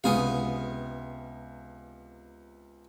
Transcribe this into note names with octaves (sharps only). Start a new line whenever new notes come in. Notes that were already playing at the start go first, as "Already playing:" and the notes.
C#2 C3 B3 G#4 F5